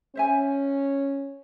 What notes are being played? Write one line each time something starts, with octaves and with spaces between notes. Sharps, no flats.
C#4 C5 E5 G#5